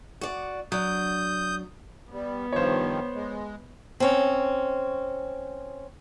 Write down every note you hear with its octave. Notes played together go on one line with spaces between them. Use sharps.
F#4 D5
F#3 D4 D#6 G6
G3 B3
G2 D#3 F3 C5 C#5
G#3
C4 C#4